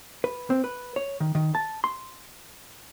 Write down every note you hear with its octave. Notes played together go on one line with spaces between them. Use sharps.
B4
C4
B4
C#5
D#3
D#3
A5
C6